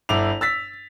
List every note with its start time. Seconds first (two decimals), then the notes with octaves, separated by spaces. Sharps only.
0.09 G1 E4 D6 F7
0.41 E6 A6 B6